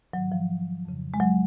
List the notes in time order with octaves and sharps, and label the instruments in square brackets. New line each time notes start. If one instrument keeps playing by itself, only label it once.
[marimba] G#2 D#3 F#3
F3
F2 C#3
G#3
F#3